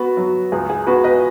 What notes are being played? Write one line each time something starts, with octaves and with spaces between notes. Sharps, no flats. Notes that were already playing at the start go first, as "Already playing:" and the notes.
Already playing: B3 F#4 B4
F#3
C#2 G#4
G#4
B3 F#4 B4
B4 D#5